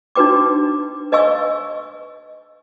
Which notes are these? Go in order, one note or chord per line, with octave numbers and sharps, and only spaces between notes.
D4 D#4 F#4 B4 G5 D6
B4 D#5 F5 G#5 C#6 E6